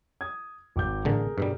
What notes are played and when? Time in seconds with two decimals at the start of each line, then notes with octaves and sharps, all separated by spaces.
0.21 D#6 G#6
0.76 G#1 D6 G6
1.05 A1 D3 G#4 A#4
1.38 G2 B2 G3